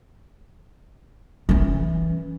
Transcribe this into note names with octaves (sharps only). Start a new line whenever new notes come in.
E3 C#4